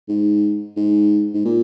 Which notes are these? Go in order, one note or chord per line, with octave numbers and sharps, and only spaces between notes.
G#2
G#2
G#2
A#2